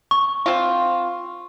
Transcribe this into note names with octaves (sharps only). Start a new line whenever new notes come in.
C#6
C4 F4